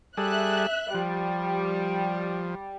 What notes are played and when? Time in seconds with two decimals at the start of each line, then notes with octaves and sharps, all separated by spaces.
0.17 G3 G#4 A4 E5 F#6
0.94 F3 G3